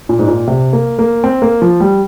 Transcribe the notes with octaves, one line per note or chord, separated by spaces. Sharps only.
A#2
G#2
A#2
C3
A#3
A#3
C4
A#3
F3
G3